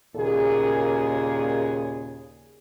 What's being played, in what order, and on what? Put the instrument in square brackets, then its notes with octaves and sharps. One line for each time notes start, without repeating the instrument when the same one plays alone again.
[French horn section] D#2 A#2 C#3 G#4